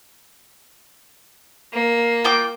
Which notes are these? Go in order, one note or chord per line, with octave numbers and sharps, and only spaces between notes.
A#3
F4 G5 D6